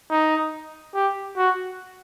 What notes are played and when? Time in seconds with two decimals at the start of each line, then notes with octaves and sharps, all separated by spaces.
0.10 D#4
0.95 G4
1.37 F#4